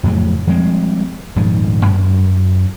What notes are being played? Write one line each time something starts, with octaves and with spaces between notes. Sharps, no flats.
F2 A2 C#3 F#3
F3 G3 G#3 C4
D#1 G#2 F3
F#2